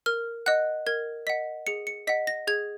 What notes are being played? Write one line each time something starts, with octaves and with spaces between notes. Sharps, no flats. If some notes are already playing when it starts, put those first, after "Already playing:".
A#4 F6
D#5 F#5 F#6
A#4 G#6
D#5 F#5 B6
G#4 C#7
C#7
D#5 F#5 B6
A#6
G#4 G#6